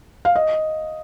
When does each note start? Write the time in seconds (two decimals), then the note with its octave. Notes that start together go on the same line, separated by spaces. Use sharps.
0.25 F5
0.36 D#5